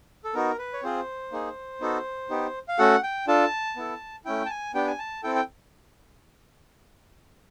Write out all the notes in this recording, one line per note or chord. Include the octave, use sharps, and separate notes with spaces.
A4
B3 D#4 F#4 A#4
B4
C#5
C4 F4 G#4 C5
A#3 D#4 G#4
B3 D#4 F#4 A4
B3 D#4 G4
F5
A3 C#4 F#4 A4 F#5
G5
D4 F4 A4 A5
B3 E4 A4
A3 C#4 E4 G5
A5
G#5
B3 D4 G4 G5
G#5
A5
C4 E4 A4 G5
G5